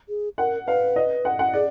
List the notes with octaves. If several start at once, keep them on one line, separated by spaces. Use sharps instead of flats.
G#4
A#4 F#5
B4 F5
D#5
F#5
F#5
G#4 D5